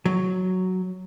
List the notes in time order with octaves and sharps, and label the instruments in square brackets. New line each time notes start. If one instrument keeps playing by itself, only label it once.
[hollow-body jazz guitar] F#3